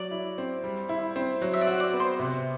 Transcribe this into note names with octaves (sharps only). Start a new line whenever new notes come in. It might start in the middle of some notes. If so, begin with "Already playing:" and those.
Already playing: F#3 D5
E4
C4
G3
E4
C4
F#3
E5
D5
F#4
D5
B3
C5
C3